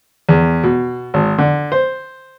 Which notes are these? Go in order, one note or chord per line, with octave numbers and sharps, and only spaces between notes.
E2
B2
G#1
D3
C5